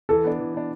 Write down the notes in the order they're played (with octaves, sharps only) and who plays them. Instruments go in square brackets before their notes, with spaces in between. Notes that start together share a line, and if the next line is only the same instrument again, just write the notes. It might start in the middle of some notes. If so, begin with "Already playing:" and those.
[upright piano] E3 [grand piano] A4
[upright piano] B3 D4
E3
B3 D4